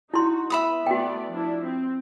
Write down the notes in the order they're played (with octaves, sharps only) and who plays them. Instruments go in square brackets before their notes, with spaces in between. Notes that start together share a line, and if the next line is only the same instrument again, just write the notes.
[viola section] D#4 F#4 [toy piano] E4 C6
[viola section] B3 [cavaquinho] E5 B5 D#6
[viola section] A3 B3 D5 [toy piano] F#4 G5
[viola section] F3 D4 E4
C4